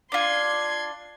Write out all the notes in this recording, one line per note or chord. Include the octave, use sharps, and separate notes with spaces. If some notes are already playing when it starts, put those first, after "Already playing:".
D4 F4 C6 G#6